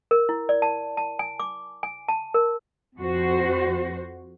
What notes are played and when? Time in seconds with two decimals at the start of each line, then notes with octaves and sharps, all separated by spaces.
0.11 A#4
0.29 E4
0.49 D5
0.62 A5
0.97 A5
1.19 G#5
1.40 D6
1.83 G#5
2.08 A5
2.34 A#4
2.97 F2 F#4 C5